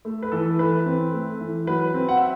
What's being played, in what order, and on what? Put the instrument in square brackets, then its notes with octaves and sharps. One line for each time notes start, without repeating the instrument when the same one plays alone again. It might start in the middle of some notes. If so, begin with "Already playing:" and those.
[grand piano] A3
B4
E3 A4
E3 B4
C4
A3
E3
F#3 B4
C4
F#5
E5